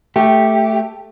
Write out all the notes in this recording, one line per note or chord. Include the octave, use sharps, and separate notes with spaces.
A3 G4